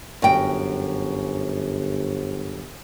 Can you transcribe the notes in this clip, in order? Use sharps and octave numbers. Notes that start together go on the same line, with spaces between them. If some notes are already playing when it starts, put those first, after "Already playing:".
G1 F#2 G5